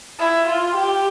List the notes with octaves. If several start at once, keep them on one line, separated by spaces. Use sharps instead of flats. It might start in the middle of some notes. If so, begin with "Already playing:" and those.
E4
F4
G4